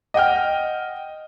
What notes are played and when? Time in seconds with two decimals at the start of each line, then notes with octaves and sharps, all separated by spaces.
0.14 D#5 F#5 G5 F6